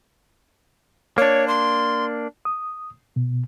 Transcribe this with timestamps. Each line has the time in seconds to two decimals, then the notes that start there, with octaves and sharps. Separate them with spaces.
1.18 A#3 D4 C#5
1.48 C6
2.45 D#6
3.16 B2